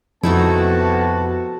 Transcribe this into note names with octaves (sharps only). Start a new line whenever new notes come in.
F2 C3 A3 B3 D#4 E4 F#4 A5